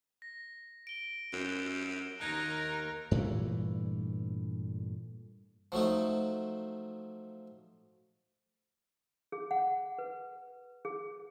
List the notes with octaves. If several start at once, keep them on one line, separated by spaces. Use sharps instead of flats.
A#6
D7 G7
F#2
D#2 D#4 A#4 F#6 G#6 A#6
G2 A#2 E3 A3
F3 F#3 A3 D#4
G#4
F#5
B4
G#4